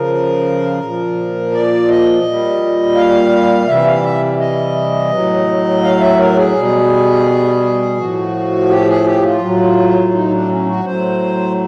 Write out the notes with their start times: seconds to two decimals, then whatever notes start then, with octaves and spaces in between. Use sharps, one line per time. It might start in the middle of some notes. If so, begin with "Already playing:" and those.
Already playing: C#3 F3 A#4
0.80 A#2 F3
1.52 D5
1.88 D#5
2.23 A#2 G3
2.96 F5
3.67 C3 E3 G3 E5
3.86 F5
4.03 E5
4.40 D#5
5.11 A2 F#3
5.83 F5
6.00 E5
6.18 A#4
6.36 G#4
6.55 B2 G3
7.97 A2 F3 F#4
8.69 G4
8.87 G#4
9.05 G4
9.23 F4
9.40 A2 F#3
10.13 D#4
10.31 D4
10.49 C#4
10.66 F#4
10.85 A2 F#3 C5